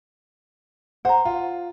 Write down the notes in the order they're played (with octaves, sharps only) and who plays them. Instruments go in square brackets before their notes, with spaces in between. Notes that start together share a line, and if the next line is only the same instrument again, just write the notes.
[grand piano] C5 [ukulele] F#5 A#5
[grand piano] F4